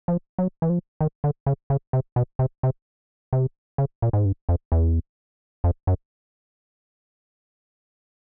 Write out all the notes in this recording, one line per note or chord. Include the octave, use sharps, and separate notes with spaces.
F3
F#3
E3
F3
D#3
D3
C#3
C#3
C3
B2
C3
C3
C3
C#3
A#2
G#2
G2
F2
E2
F2
F#2